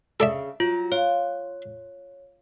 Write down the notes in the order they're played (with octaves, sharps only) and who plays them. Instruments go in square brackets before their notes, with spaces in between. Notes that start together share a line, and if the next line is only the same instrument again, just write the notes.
[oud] C#3 [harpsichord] A4 D5 E5
[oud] F#3 [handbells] F4
[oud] F4 [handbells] C#5